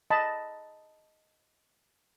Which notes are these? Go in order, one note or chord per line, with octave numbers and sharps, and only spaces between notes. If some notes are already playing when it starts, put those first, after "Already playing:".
D#5 A5 B5